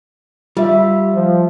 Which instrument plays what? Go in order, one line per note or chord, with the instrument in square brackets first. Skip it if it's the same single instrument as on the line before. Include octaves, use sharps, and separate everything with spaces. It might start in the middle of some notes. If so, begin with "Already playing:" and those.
[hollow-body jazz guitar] G3 [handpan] F4 E5
[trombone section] F3